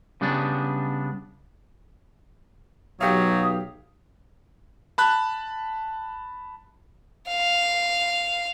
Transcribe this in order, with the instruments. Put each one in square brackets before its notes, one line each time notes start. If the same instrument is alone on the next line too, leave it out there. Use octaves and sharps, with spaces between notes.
[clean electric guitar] C#3 G3 B3 D4
[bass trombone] B1 [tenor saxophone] F#3 [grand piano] G4 F5 [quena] D#6
[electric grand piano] A5 B5 F#6
[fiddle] F5